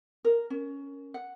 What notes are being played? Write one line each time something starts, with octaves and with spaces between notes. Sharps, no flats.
A#4
C#4
F#5